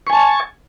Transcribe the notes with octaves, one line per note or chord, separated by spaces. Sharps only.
G#5 A5 C#6